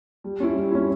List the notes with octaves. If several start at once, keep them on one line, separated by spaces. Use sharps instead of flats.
G3
C#4 E4
G3
C#4 E4